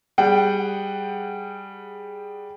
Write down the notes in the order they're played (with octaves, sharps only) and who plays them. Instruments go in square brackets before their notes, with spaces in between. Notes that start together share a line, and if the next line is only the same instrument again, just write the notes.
[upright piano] G3 G#4 F#5 G5